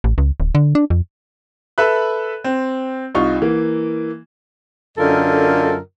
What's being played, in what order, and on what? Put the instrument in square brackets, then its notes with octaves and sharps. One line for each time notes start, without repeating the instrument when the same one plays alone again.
[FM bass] A1
C#2
D1
D3
D4
F2
[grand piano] A4 B4 E5 B5 F#6
C4
C2 D#4 F4 C#6
E3 A#3
[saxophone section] F#2 D3 F4 A4 A#4 D#5